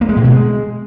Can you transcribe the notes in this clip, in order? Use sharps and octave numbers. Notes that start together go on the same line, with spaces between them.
A#3
G#3
A2
B2
G#3